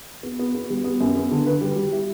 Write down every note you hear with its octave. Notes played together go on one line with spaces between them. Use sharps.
B3
B3
B3
G3
B3
F#2
B3
D3
B4
G3
G3
E4